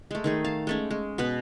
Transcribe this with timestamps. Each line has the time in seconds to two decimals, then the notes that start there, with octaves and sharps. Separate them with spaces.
0.11 G#3 A3
0.24 D#3 A3 G#4
0.45 F5 A5
0.67 G#3 A3 C#4
0.91 G#3
1.18 B2 B3 B4